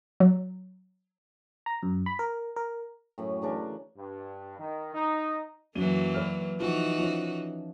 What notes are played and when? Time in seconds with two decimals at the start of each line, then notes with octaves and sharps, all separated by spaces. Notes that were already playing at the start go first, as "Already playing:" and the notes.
0.20 F#3
1.66 A#5
1.83 F#2
2.06 B5
2.19 A#4
2.56 A#4
3.18 F#2 A2
3.42 C#3 E3 D4 A#4
3.97 G2
4.59 D#3
4.94 D#4
5.75 F#2 E3 F#3 A#3 D#7 G7
6.14 B4 D5 F6
6.60 E3 F3 D#4 F#4
6.98 F3 C#4